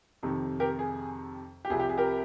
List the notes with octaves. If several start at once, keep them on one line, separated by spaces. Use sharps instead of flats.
F2 C3 D#3
G4 A#4
G#4
G4
C2 C3 F3 G#4
G4
G#4
G4 A#4